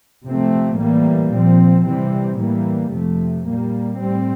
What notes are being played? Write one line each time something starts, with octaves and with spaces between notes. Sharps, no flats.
C3 F3 A3 C4
A2 E3 G3 A#3
A#2 F3 C4
C3 E3 G3 C4
A2 E3 G3 A#3
F2 C3 F3 A3
A#2 G3 A#3
A2 G3 C4